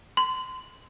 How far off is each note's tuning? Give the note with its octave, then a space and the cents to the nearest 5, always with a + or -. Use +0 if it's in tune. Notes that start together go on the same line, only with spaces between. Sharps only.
C6 -30